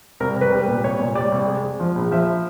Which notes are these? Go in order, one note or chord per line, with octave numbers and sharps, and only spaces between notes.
C2 A#4
C2
B4
G3
B4
A#2
C2 C#5
A#2
G3 D5
C2
G#3
G#3
F3
A#1
F3 E5